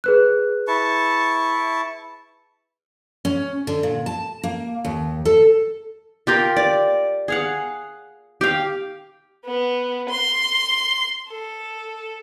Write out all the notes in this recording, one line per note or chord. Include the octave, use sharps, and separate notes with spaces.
G#4 B4 F#6
E4 A5 C#6
C#4
D3
A#2
A5
A#3
D#2
A4
F4 G4 A#4
D5
G#4 F5 F#5
G4 F5
B3
C6
A4